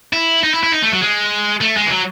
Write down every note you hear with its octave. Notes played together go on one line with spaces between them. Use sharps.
E4
D#4
E4
E4
D#4
A3
F#3
G#3
A3
G#3
E3
F#3